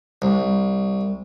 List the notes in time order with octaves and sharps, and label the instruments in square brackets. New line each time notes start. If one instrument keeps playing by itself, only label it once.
[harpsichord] C2